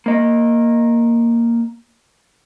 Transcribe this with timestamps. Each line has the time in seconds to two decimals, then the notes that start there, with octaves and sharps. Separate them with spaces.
0.06 A#3 D#5